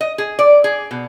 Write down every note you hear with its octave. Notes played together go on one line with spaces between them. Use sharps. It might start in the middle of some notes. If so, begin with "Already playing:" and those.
D#5
G#4
D5
G#4
B2